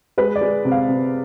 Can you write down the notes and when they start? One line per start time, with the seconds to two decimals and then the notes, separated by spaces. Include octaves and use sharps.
0.18 G#3 B4
0.36 D5
0.41 G#3
0.65 C3
0.71 F5
0.89 C3